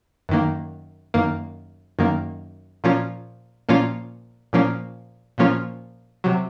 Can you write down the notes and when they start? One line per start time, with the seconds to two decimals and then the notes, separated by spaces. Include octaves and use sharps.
0.29 F#2 D#3 A#3
1.14 F#2 D#3 A#3
1.99 F#2 D#3 A#3
2.84 A#2 F3 A#3 C#4 F4
3.69 A#2 F3 A#3 C#4 F4
4.53 A#2 F3 A#3 C#4 F4
5.38 A#2 F3 A#3 C#4 F4
6.24 C3 F#3